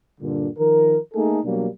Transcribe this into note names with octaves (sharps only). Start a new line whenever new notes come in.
G2 A#2 D3
D#3 F3 A#4
A3 A#3 D#4 G#4 A4
B2 F#3 G3 A#3 D4